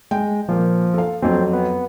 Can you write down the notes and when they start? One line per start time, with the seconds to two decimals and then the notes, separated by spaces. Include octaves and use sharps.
0.11 G#3 G5
0.49 A#2 F3 A#3
0.94 A4 F5
1.22 F2 F#3 C4
1.53 B3